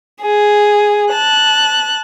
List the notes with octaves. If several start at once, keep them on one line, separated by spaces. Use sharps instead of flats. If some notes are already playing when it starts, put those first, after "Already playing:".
G#4
A5 F#6